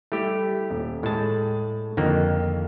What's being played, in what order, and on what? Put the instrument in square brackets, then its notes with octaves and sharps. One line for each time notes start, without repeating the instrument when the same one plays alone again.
[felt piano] G3 E4 [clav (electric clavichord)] A3 G4
[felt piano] D#1
[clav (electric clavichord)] A2 A5 [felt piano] G#3 G#4
[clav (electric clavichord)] F2 A#3 [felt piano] D3 D#3